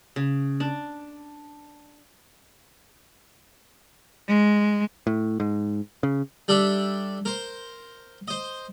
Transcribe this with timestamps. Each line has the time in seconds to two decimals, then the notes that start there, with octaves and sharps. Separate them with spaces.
0.16 C#3
0.60 D4
4.28 G#3
5.07 A2
5.40 G#2
6.03 C#3
6.48 G3 D4 A4 D5 E5
7.25 A#4 C5
8.28 C5 D#5